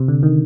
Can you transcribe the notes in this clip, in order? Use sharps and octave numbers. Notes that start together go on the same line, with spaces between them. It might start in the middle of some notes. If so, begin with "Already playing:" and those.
Already playing: C3
D3
D#3